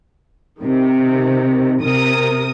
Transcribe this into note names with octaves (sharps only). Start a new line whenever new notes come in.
C3 D#3
C3 A#4 D#6